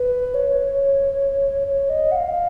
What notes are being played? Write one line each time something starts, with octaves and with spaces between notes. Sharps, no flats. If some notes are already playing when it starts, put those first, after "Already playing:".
Already playing: B4
C#5
C#5
D#5
F#5
F5